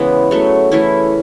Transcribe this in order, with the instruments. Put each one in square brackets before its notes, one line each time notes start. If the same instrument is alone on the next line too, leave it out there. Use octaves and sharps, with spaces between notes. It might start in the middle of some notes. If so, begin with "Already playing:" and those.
Already playing: [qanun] C#3 E3 G#3 B3
C#3 F#3 A3
E3 A3 C#4 E4